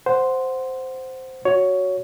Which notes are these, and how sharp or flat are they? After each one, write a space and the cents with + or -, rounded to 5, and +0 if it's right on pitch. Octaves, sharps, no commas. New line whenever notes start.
C5 -5 F#5 +0
F#4 +0 C#5 +10